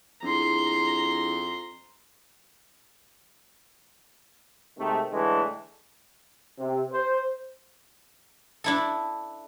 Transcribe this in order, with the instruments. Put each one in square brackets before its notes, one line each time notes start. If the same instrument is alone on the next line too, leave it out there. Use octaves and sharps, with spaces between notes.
[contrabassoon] F2 [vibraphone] D4 E4 G#4 [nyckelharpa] A#5 C6
[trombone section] G#2 C3 D#3 A3
A2 D3 E3 G#3 A3
C3
C5
[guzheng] D4 E4 A4